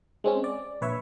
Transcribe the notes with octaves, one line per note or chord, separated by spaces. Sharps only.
G#3 C4 C#4
D5
A#1 B4 C#5 E5